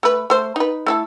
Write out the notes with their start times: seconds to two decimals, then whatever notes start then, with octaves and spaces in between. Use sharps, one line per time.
0.03 A3 B4
0.30 A3 C5
0.56 D#4 B4
0.86 A3 E4 A4